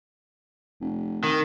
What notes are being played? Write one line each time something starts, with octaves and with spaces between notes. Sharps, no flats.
F1
D#3